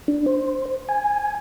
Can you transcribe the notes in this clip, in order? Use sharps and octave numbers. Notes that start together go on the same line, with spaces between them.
D4
C5
G#5